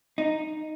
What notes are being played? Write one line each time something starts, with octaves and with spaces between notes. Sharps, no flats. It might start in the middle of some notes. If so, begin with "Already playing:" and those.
D#4